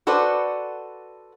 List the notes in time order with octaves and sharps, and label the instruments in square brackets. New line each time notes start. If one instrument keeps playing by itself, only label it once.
[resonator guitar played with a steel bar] F#4 A4 B4 C5 D5